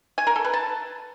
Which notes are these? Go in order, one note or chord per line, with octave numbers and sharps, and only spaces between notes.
G#5
A#4
A4
B4
A5